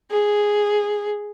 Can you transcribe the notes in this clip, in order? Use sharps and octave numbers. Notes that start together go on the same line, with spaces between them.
G#4